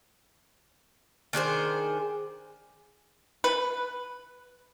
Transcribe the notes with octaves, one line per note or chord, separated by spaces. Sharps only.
D#3 D4 G#4 C5
B4